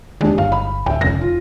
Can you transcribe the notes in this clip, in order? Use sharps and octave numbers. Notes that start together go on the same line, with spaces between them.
D#2 G#3 D4 G4
G1 F5
B5
D1 E5 G5
F1 C#3 A#6
F4